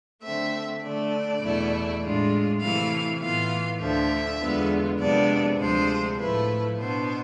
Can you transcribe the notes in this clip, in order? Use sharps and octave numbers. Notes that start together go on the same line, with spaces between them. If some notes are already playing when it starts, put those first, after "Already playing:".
D3 A3 C4 E5
D3 A3 D4 D5
E2 B2 A3 E4
A2 G#3 D4 F4
C3 E3 A3 E4 F5
A2 E3 B3 F4 F5
D2 D3 F3 E5
E2 D3 G#3 B3 F4
F2 C3 G#3 B3 D4 D5
D2 C3 F3 G#3 D4 C5
A2 F3 A3 E4 B4
B2 B3 D4 C5